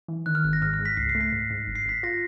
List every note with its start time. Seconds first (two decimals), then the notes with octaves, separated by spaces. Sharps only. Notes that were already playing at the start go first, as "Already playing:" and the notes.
0.08 E3
0.26 D#3 F#6
0.35 F6
0.44 G#1 F#6
0.53 A#6
0.62 G#2 F6
0.74 F6
0.79 G#2
0.85 B6
0.97 C#2 C7
1.09 C7
1.15 A3
1.21 B6
1.33 G#2
1.50 G#2
1.68 G1
1.75 C7
1.86 G1 B6
2.03 F4 A#6